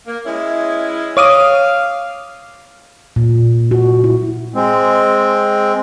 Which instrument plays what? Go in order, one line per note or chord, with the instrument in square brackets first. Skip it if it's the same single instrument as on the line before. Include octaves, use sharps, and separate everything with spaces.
[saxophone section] A#3
G#3 C#4 E4
[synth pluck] C#5 D6 D#6 [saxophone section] F5
[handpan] A#2
F#4
E4
[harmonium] G#3 C4